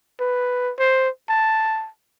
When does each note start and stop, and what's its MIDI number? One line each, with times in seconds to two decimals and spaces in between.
0.20 0.72 71
0.79 1.09 72
1.29 1.88 81